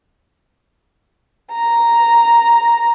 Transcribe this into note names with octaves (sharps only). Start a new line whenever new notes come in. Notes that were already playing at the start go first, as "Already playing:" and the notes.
A#5